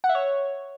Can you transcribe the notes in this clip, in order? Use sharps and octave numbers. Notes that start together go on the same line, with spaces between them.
F#5
E5
C#5